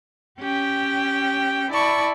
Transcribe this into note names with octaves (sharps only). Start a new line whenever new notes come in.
C#4 G4 G5
E4 D5 A5 B5 C#6